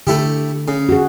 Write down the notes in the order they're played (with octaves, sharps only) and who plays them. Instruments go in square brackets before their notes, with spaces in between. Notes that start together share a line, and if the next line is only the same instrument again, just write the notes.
[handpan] D3 [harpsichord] A3 E4 G4
[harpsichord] C#3
[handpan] F#4 G#4